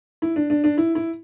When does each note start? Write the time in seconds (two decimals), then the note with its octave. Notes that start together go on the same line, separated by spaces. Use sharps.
0.22 E4
0.36 D4
0.50 D4
0.64 D4
0.78 E4
0.95 E4